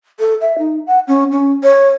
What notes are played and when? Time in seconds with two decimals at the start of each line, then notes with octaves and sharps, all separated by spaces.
0.19 A4
0.41 E5
0.59 D#4
0.87 F#5
1.08 C#4
1.32 C#4
1.63 C#5